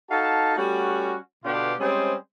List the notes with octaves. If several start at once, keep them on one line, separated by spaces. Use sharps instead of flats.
D#4 F#4 A4 F5 A5
G3 A3 C#4 F#4
B2 D3 B3 D4 F4 G4
G3 G#3 C4 C#4 G#4 C5